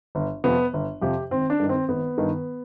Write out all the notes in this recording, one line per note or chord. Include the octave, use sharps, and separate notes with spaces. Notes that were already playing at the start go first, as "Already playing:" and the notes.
G1
F2 C3 F3 B3
G1
F2 C3 F3 G4
G#1 C4
D4
G2 D#3
C4
G#1 B3
G2 D#3